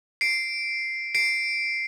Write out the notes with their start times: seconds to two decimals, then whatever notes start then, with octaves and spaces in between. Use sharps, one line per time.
0.21 C7 D7
1.15 C7 D7